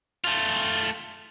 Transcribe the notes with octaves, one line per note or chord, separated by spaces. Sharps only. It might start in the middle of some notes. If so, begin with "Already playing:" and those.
A3 F4